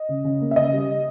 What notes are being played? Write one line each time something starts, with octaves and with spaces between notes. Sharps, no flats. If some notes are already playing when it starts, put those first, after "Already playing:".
Already playing: D#5
C#3
C#3
A#3
E5
C#3 D#5
G3